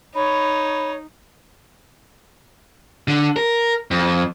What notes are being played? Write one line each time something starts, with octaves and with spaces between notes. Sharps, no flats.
D#4 C#5 B5
D3
A#4
F2